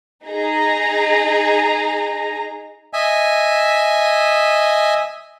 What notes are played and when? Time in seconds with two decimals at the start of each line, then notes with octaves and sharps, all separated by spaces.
0.25 D#4 G#4 A#5
2.93 D#5 E5 G#5